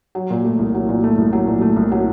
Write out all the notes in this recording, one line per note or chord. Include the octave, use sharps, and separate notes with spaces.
F#3
A#2
A3
C2
F#3
A#2
A3
C2
F#3
A#2
A3
C2
F#3